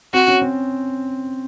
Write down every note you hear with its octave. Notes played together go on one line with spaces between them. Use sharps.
C4 F#4
C#4
C4